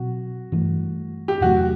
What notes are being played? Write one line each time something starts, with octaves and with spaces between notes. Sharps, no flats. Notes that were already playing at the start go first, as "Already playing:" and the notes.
Already playing: B2 F#3 C4 F#4
G2 E3 A3
G4
E2 C3 F#3 A3 F#4